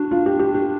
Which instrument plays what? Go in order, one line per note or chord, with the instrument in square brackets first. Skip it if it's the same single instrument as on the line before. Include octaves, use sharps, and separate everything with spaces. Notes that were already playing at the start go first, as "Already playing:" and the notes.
Already playing: [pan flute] D4 [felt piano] F#4
[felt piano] F4
G4
G4
G4